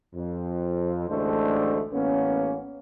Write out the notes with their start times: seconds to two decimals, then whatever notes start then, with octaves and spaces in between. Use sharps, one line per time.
0.15 F2
1.09 A1 D2 G#3 A3 D4 C5
1.92 A1 A#3 B3 C#4